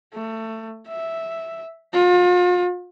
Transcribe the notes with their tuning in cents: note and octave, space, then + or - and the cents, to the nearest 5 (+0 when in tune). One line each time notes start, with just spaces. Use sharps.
A3 +20
E5 -5
F4 +40